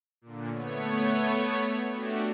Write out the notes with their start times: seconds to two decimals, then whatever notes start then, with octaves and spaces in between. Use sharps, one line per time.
0.21 A#2 D3
0.51 A3 B3 C#5
1.93 A3 D4 F#4 G4